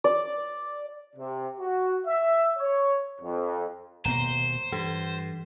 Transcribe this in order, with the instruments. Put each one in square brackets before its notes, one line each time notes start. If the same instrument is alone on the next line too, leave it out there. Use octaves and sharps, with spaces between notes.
[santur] D5
[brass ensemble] C3
F#4
E5
C#5
F2
[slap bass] D#1 B2 A#3 [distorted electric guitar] C5 [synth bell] A#5
[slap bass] G2 [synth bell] E3